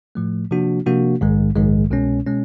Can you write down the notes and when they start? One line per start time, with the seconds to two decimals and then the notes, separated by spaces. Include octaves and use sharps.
0.15 A2 F3 A3
0.51 C3 F3 A#3 D4 F#4
0.86 C3 F3 A#3 D4 F#4
1.21 A#1 G#2 D#3 G#3
1.55 A#1 G#2 D#3 G#3
1.90 C2 B2 G#3 C#4
2.27 B2 G#3 C#4